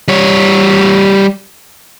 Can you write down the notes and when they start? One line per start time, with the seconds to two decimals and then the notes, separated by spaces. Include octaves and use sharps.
0.08 G3 C#5